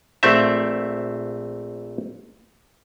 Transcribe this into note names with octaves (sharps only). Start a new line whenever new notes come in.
A#1 A3 C4 E5